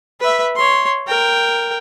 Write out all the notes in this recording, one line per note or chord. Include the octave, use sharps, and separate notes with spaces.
B4 E5
C#5 C6
A#4 G5